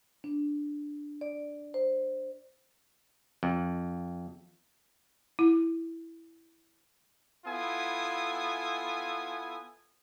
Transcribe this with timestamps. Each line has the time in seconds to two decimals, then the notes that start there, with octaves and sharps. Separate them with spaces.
0.24 D4
1.21 D5
1.74 C5
3.43 F2
5.39 E4
7.46 B3 E4 F4 A4 G#5 D#6